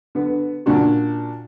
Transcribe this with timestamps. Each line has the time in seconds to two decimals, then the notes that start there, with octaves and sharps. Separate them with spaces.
0.15 D3 B3
0.66 A#2 C#4 D4 F#4